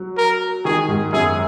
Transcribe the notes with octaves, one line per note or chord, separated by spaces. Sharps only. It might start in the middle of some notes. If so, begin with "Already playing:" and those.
Already playing: F#3
A#4
D#3 G#4
G#2
F#2 G#4